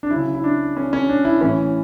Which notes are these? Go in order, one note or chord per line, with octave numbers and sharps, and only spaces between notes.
D4
F#3 E4
C#3
E4
D4
C#4
C#4
D4
E4
A2 E3 C#4